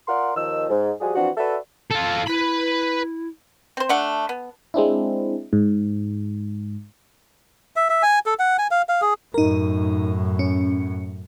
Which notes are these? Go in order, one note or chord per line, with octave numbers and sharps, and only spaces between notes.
F4 A#4 D5 F5 F#5 C6
D#2 D#3 F3 D#5 E6
G#2
F3 G3 F#4 G#4
E3 F3 C4 D4 F#4
F#4 A4 B4 D5 E5
F4 A4
E4 B4 B5
C4 C5
A3 D4 F#5
B3
G#3 C4 D4 E4
G#2
E5
E5
G#5
A4
F#5
G#5
F5
F5
G#4
F#2 A2 D#4 A#4
C#4